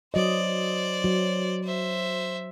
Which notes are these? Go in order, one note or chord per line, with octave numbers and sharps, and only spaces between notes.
F#3 C5 D5 D#5
F#3
C5 E5